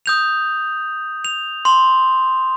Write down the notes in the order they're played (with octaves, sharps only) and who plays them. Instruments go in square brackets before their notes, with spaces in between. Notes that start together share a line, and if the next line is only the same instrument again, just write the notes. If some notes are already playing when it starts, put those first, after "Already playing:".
[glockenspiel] D#6 G6 F7
F7
C6 F7